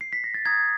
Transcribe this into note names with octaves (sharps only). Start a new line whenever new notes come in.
C7
B6
A#6
A6
A#5 D#6 F#6 G#6